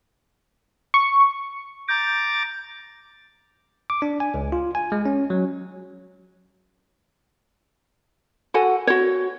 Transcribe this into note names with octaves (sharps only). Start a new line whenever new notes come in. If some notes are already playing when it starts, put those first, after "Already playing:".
C#6
A#5 D6 G6 A6
D6
D4
G#5
C#2
F4
G#5
G#3
C#4
F#3
F#4 A4 F#5 G#5
F#4 C#5